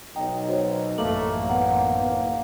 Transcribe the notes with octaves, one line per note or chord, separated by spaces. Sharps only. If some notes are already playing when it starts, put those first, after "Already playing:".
B1 D#4 G5
F#4 C5 C#5
A1 F#2 A3 A#3 F#7
B3 A#4 D5 F#5
F#1